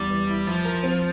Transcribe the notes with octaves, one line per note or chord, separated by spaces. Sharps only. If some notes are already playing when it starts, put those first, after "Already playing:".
Already playing: E2 G3
E3
E4
F3 E4
A#4
C4